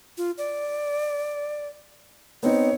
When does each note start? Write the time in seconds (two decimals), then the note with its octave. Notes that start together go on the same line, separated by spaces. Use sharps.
0.17 F4
0.38 D5
2.43 B3 C4 D#4 C#5